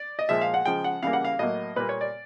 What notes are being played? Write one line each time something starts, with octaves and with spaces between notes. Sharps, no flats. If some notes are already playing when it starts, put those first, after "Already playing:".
Already playing: D5
D#5
A#2 F3 G#3 E5
F5
F#5
C#3 F3 G#3 G5
F#5
C#3 E3 G3 A#3 F5
F#5
F5
A2 F#3 A#3 D#5
A#2 G3 A#3 B4
C#5
D5